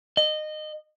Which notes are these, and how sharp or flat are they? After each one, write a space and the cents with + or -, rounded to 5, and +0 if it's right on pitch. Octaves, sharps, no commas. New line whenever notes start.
D#5 -20